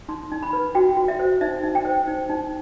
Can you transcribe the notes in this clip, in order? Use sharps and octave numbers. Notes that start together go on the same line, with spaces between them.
D#4 C6
D#4
B5
B4
F#4 G5
F#4
E5
C5
D#4 E5
D#4
G5
C5
D#4
D#4